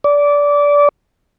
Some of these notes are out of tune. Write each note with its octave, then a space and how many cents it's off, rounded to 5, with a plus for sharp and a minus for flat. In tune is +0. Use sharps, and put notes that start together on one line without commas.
D5 -20